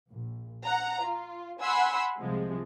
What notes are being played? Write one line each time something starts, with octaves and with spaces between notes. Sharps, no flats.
A#1
F#5 A#5
F4
F#5 G#5 B5 C6 E6
C2 C3 F3 G#3